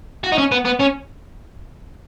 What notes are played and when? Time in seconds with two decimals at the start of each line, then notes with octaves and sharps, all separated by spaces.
0.24 F#4
0.32 D#4
0.38 C#4
0.52 B3
0.65 B3
0.80 C#4